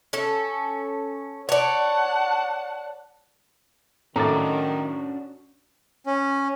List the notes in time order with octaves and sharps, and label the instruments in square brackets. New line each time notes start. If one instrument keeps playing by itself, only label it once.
[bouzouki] C#4 A4
[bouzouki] C#5 D5 [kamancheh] F#5 A5
[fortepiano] A2 [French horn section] D#3 [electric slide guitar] C#4 D4 F#4 [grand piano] A#5 D6 A6
[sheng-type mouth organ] C#4